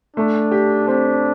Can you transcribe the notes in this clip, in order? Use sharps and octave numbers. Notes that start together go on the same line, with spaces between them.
A3 D4
G4
C4 D4